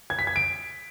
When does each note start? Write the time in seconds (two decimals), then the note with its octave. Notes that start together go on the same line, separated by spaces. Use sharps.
0.10 G#6
0.19 B6
0.27 G#6
0.36 D7